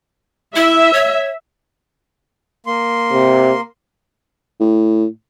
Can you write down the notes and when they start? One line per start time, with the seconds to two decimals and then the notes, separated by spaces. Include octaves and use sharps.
0.56 E4 E5
0.93 C#5
2.66 A#3 C6
3.12 C3
4.60 A2